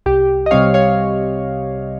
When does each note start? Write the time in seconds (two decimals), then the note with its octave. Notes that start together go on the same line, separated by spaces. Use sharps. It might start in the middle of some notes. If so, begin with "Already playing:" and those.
0.06 C2 G4
0.46 D#5
0.51 C3 G3 C4 C#5 F5
0.74 C#5 F5